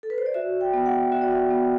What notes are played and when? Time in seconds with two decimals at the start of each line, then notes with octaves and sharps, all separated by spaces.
0.03 A4
0.10 B4
0.18 C5
0.26 D5
0.34 F#4 E5
0.61 G5
0.73 B3
0.86 F#5
1.12 F#4 E5
1.22 D5
1.32 E5
1.50 B3